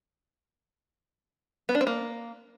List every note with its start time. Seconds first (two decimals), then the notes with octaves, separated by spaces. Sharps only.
1.69 B3
1.75 D4
1.81 C4
1.87 A#3